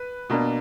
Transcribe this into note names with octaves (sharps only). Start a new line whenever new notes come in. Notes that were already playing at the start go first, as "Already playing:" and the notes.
Already playing: B4
B2 A#3 D4